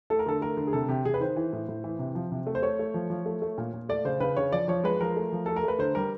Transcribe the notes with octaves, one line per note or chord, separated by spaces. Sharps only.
A3 A4
A#4
D3 A4
A3 A#4
D3
G#4
C3 A4
C3 G4
C3 G#4
B4
D#3 C5
E3
A2
A2
E3
C3
F3
C3
A3
C5
A3 C#5
A3
F3
F3
A3
A3
A#2
A#2
A3 D5
C#3 C5
C#3 B4
C#3 C#5
F3 D5
F3 C#5
G#3 B4
F3 A#4
A3
F3
A3 A4
A#4
A3 B4
D3 C5
G3 A#4